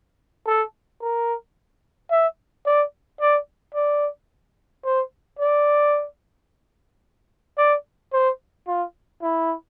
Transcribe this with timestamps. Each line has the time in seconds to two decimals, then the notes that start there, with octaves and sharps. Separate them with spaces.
0.47 A4
1.02 A#4
2.11 E5
2.66 D5
3.21 D5
3.75 D5
4.85 C5
5.39 D5
7.58 D5
8.13 C5
8.68 F4
9.22 E4